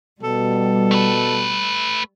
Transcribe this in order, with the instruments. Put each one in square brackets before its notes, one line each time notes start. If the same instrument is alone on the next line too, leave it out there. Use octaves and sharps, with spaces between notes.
[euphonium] B2 [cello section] G3 [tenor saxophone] A4
[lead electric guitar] A3 B4